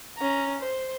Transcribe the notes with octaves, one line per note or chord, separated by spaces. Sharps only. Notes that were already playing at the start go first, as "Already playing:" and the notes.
C#4 A#5
C5